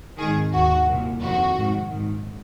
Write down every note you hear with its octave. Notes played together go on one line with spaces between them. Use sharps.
G#1 G#2 D#3 G#4
D#2 D#3 F#4
C2 A#2
F2 C3 D#3 F#4
G#1 G#2 D#3
A#1 G#2 D#3